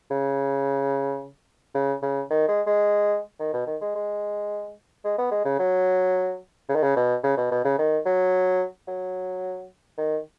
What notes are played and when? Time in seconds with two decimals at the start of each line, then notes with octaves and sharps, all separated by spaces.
0.11 C#3
1.75 C#3
2.02 C#3
2.30 D#3
2.48 G#3
2.66 G#3
3.40 D#3
3.53 B2
3.67 D#3
3.81 G#3
3.95 G#3
5.04 G#3
5.18 B3
5.31 G#3
5.45 C#3
5.59 F#3
6.69 C#3
6.75 D#3
6.83 C#3
6.96 B2
7.23 C#3
7.37 B2
7.51 B2
7.65 C#3
7.79 D#3
8.06 F#3
8.88 F#3
9.98 D#3